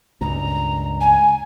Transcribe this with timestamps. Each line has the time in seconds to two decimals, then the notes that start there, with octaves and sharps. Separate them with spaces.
0.21 C#2 G2 A#2 A#5
1.00 G#5